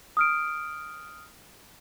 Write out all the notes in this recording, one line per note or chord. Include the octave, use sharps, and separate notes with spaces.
D#6 F6 D7